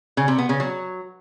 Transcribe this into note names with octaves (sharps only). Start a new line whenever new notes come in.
C#3
C3
B3
C#3
F#3